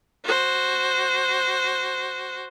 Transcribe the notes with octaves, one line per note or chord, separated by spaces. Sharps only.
F#4 C5